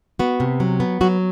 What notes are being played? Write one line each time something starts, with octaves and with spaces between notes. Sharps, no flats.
B3 F#4
C3
F#3
B3
F#3 F#4